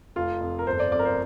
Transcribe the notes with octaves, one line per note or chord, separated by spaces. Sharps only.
F1 F4
F2
A#4
G1 C5
D5
F2 D5
A#4
C5